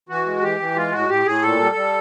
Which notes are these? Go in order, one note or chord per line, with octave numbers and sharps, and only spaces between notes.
E3 F#4
G#3
E3 G4
E3
G#3 F4
A2 F#4
A2 G4
A2 G#4
A#2 A4
G3
G3